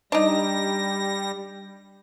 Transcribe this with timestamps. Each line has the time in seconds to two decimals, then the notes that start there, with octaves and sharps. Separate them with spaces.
0.12 G3 D4 D#4 A#6